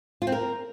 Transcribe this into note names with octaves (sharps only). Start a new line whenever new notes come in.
F4
C4
A#4